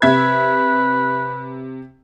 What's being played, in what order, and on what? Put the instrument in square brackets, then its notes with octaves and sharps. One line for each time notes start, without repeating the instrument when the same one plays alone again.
[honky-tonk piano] C3 E5 G#6 [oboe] B4